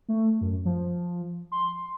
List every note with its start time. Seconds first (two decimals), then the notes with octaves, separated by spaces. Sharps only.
0.08 A3
0.41 F#2
0.65 F3
1.52 C6